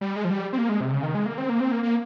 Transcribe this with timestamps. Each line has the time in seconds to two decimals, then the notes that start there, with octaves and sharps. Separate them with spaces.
0.01 G3
0.16 G#3
0.25 F3
0.30 G3
0.53 C4
0.58 A#3
0.69 G#3
0.81 C3
0.92 C#3
1.03 D#3
1.15 G#3
1.26 A#3
1.38 C4
1.49 A#3
1.60 C4
1.72 A#3
1.83 A#3